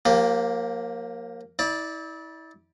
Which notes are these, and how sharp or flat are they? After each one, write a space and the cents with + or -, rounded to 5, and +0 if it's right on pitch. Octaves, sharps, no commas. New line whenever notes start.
F3 +40 A#3 +0 G4 +0
E4 -35 D5 +0